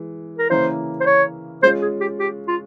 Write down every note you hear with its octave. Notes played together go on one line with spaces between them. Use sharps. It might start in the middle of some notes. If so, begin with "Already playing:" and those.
Already playing: E3 G#3
A#4
C#3 E3 A#3 C#4 E4 C5
C5
C#5
G#3 C#4 F4 C5
G#4
G4
G4
F4